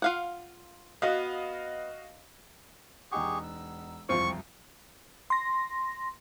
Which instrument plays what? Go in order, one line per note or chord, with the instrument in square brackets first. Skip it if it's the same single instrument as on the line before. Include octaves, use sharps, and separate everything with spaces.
[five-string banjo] F4 F5 F#5
[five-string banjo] B3 [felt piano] F#4 D#5 F5
[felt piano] E1 D#4 F#5 [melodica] G4 G#4 C#6
[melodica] E6
[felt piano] E1 C2 F2 [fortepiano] C4 F4 [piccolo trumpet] C#6
[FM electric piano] C6 A#6